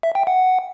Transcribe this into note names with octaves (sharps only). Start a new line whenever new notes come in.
E5
G5
F#5